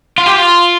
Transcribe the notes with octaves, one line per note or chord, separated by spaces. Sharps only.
F4
G4
F4